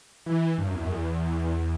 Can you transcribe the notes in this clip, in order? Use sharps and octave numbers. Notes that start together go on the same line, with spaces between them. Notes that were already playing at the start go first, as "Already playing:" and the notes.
E3
G2
F#2
E2
F#2
E2